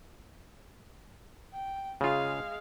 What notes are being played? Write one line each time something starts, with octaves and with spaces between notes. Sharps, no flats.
G5
C#3 G#3 F4 F5